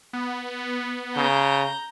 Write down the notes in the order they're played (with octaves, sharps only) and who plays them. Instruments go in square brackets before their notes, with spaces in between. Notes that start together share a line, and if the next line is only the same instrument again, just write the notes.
[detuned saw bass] B3
[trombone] C#3 [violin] A#5 G6